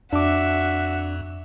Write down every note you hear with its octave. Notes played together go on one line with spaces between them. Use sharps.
F2 D4 F#4 E5 D6